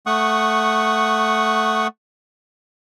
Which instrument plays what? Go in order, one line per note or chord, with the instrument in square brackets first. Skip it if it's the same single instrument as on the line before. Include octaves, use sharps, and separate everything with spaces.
[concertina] A3 F#5 C#6 D#6